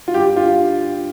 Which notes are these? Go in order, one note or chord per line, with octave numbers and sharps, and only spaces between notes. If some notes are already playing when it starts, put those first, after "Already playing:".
F4
G2 G4
F4